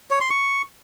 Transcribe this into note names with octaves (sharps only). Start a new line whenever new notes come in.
C#5
C6
C#6